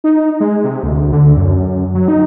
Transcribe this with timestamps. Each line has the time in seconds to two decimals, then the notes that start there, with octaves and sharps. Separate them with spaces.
0.04 D#4
0.40 G#3
0.64 C3
0.83 D2
1.13 D3
1.37 F#2
1.95 F#3
2.08 D#4